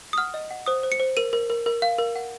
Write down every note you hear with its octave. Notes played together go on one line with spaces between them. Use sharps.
D#6
F#5 F6
D#5
F#5
C5 D#6
C5
C#7
C5
A#4 D#7
A#4
A#4
A#4
F5
A#4
F#5